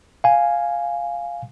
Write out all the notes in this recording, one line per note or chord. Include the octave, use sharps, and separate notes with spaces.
F5 G#5